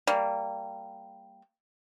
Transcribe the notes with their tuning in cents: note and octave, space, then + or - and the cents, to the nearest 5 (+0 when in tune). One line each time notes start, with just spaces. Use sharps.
G3 -5 A#3 -20